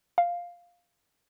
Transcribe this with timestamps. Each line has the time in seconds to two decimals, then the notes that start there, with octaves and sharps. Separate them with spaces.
0.18 F5